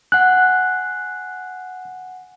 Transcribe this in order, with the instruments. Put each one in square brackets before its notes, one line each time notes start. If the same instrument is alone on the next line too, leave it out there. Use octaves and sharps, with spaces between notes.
[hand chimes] F#5 G#5 [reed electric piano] F#6